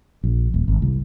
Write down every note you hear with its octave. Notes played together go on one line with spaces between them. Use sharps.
A#1
D#1
G#1
C2